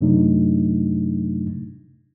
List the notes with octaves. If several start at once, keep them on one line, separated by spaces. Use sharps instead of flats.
F#2 C3 F#3 A3 D4 D#4